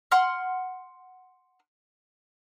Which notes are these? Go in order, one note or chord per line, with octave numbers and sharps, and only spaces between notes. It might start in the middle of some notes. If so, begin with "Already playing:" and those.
F#5 C6 F6